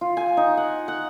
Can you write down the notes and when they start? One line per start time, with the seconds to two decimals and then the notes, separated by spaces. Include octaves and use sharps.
0.01 F4
0.17 G#5
0.37 D#4
0.57 F#5
0.88 F#5